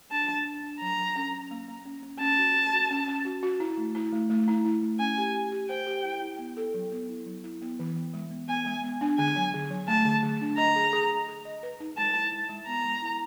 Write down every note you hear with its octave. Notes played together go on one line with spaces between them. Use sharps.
D4 A5
D4
D4
D4
F#3 A#5
F#3
C#4
C#4
A#3
A#3
C#4
C#4
C#4 A5
F#4
C#4
F#4
C#4
C#4
F#4
F#4
E4
A3
E4
A3
A3
E4
E4
A3
C#4 G#5
G4
G4
G4
C5 G5
G4
E4
E4
B3
A4
F#3
B3
E4
F#3
E4
B3
E3
B3
G#3
B3
B3 G#5
G#3
B3
D4
D3 G#5
F#3
D3
F#3
A3 A5
D3
D3
D4
D#5 A#5
G#4
G#4
G#4
G#4
D#5
B4
D#4
G#3 A5
E4
G#3
G#3
B3 A#5
G#3
E4